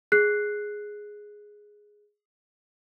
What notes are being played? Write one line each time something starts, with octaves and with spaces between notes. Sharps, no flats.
G#4 F#6 C7